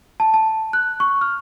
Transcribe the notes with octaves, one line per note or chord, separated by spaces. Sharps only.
A5
A5
F#6
C#6
F6